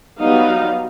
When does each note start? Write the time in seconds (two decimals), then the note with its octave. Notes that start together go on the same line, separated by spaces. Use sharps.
0.19 F#3 G3 B3 D#4 F5